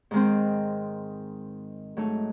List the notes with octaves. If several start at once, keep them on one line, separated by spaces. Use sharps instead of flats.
G#2 D#3 G#3 C4
G#2 F#3 A3 D#4